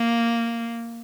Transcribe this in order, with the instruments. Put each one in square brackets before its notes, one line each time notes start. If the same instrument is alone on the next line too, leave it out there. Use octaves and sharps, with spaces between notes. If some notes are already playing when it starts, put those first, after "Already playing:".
Already playing: [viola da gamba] A#3